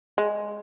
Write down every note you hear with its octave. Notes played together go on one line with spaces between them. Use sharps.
G#3